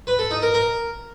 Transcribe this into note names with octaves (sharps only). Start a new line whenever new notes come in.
B4
A4
D#4
A#4
A#4